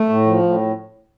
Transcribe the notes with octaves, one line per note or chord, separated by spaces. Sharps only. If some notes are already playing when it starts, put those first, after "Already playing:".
Already playing: A3
A2
F3
A2